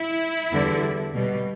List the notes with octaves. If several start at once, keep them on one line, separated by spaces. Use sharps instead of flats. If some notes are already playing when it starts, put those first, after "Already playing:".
Already playing: E4
E2 D3 G3
B2 G3